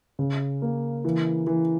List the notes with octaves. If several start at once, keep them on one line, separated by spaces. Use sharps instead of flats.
C#3
A#3
E3
E3